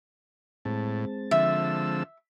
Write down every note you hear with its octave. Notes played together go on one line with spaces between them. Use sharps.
A2 G#3 C4 A5
D3 F3 E5 E6